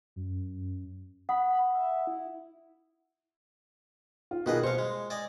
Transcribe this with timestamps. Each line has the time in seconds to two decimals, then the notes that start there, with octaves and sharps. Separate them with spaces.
0.16 F#2
1.29 F#5 B5 D#6
1.74 E5
2.07 E4
4.31 F4
4.46 B2 D#3 F4 G#4 B4 D#5
4.64 C5 F5 C#6
4.78 G#3
5.10 D5 D#5 G#5